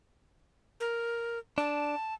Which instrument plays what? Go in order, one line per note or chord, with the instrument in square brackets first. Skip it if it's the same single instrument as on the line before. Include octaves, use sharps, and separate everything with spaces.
[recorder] A#4
[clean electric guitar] D4 [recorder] A5